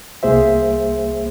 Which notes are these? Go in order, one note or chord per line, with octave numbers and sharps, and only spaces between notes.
C2 A#3 G#4 C5 E5